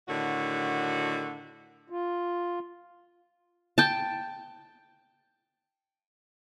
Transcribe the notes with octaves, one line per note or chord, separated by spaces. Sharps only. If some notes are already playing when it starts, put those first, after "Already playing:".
A2 D3 D#3 F#4
F4
G5 A5